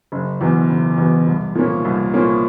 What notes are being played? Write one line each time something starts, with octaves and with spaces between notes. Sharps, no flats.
F#1
E2 B2
F#1
E2 B2
C2
A#2 F3 A#3 C#4
C2
A#2 F3 A#3 C#4